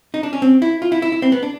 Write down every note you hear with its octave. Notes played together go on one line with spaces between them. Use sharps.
D#4
D4
C#4
C4
E4
F4
E4
E4
E4
C4
B3
D4